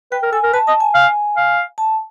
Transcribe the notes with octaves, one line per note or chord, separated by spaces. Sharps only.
B4 G5
A#4
A4 G#5
A#4
B4 A5
D#5 A5
G#5
F5 G#5
F5
A5